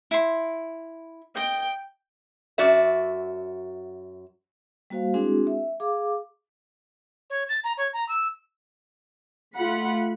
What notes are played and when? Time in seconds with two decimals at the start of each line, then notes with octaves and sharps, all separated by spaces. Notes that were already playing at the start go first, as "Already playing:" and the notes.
0.11 E4 C6
1.37 D#5 G5
2.58 F#2 F#4 D5 E5
4.90 G3 A#3 F#4 C5 F5
5.14 G#3 C4 D4 E4 F#4 G#4
5.47 E5
5.80 G#4 F5 D6
7.30 C#5
7.49 A6
7.64 A#5
7.78 C#5
7.93 A#5
8.09 E6
9.55 A3 F4 F#5 B5